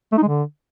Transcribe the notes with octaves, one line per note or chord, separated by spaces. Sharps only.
A3
D#4
G#3
D3